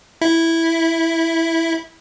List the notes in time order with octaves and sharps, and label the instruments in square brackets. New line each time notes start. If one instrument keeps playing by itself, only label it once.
[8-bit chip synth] E4